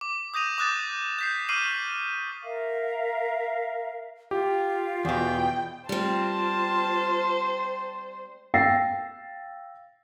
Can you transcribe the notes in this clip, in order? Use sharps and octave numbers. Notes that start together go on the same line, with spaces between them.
D6
D#6 G6 A#6 D#7 F7
D6 D#6 F#6 G6 A6 E7
G6 B6 C7
C#6 D6 F6 C7 D#7 F#7
A#4 E5 F5
F4 G4
E2 B2 G5
G3 C4 F4 C5 A5
F5 G5 E6 A6 A#6 C7